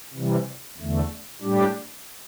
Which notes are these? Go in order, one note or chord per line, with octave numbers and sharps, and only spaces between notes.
C3 E3 G3
E2 D3 A3
A2 G3 D4 G4